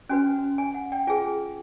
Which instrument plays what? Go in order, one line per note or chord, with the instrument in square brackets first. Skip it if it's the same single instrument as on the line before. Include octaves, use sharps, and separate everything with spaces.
[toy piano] C#4 F#4 B4 G#5
G#5
F#5
G5
F4 G#4 B4 G#5